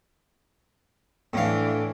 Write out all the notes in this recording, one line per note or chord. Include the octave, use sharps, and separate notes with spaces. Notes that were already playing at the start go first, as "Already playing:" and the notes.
A2 E3 D4 F5